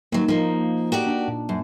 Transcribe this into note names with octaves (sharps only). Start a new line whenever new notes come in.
D#2 F#3 A#3
F3 A#3 D#4
F#4 G4 D5
A#3 D4
A#2
F#2